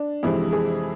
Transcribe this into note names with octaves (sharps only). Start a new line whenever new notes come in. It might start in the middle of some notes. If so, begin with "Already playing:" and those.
Already playing: D4
F2 C3 E3 G#3 E4
G#4